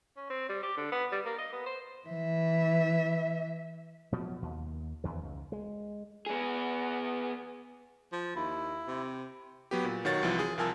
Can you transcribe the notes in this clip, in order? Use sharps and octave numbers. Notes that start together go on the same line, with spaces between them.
C#4
C4
G3
G4
D3
B3
G3
A#3
D#5
B3
C5
E3 E5
B2 F3 F#3
D#2
E2 D#3
C#2
G#3
B3 G#4
F3
D#2 E4
C3
F#3 B3 G4
A#2
B1 D#3 F#4 C#5 A6
C2 E3 F3
G#4
C2 F3 A#4 G#5 A5 E6